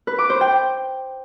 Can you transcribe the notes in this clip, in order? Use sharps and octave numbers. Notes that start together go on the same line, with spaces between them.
B4
D6
C5
G5